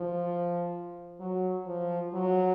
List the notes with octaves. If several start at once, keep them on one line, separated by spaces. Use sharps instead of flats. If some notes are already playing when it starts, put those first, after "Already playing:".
Already playing: F3
F#3
F3
F#3